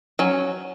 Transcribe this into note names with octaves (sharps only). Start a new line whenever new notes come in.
F#3 C#4